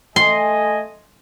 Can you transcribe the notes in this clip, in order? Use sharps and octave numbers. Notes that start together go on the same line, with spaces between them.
A3 D#5 G#5 C6